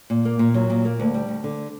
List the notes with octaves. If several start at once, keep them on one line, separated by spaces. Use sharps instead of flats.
A#2
A#3
A#2
F#3
A#2
A#3
D2
G3
D2
D3